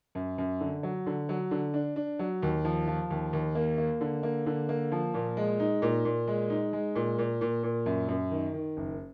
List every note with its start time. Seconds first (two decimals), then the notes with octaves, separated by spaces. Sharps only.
0.15 F#2
0.38 F#2
0.60 D3
0.83 F#3
1.06 D3
1.29 F#3
1.51 D3
1.74 D4
1.96 D4
2.19 F#3
2.43 D#2
2.65 F3
2.87 F3
3.10 D#2
3.33 D#2
3.55 A#3
3.78 A#3
4.01 D3
4.23 A#3
4.46 D3
4.69 A#3
4.92 F3
5.14 A#2
5.37 G#3
5.60 D#4
5.82 A#2
6.05 A#2
6.27 G#3
6.50 D#4
6.73 G#3
6.95 A#2
7.18 A#2
7.41 A#2
7.63 A#2
7.86 F#2
8.09 F#2
8.31 D#3
8.54 D#3
8.77 F#1